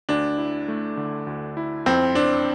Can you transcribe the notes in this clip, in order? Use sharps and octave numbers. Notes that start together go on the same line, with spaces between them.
D2 D4
E4
A3
D3
D2
E4
F2 C4
C4 D4